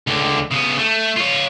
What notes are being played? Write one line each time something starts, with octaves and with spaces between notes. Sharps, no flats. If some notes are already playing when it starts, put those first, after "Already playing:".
C#2 D3
C#3 B3
A3
F4 C#5